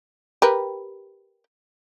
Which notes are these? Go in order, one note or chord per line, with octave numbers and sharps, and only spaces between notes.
G4 A#4 B4